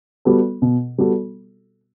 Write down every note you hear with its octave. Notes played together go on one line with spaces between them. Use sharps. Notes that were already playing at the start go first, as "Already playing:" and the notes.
G3 B3 F#4 A4
B2
G3 B3 F#4 A4